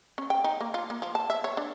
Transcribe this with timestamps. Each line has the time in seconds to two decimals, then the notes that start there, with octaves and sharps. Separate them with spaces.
0.18 C#4
0.30 G5
0.44 D#4
0.61 A#3
0.74 F4
0.90 A#3
1.02 F3
1.15 A5
1.30 E5
1.44 C#5
1.57 D4